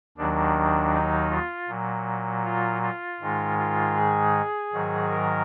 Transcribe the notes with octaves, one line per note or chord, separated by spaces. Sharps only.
D#2 D#3 F#3 D4
D#4
F4
A#2 F#3
F4
F4
G#2 D#3 G#3
F4
G#4
G#2 D#3 F#3
A#4